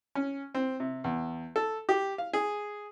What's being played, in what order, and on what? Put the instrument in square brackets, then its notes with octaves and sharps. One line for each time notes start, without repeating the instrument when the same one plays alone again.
[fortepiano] C#4
C4
C3
E2
A4
G4
F5
G#4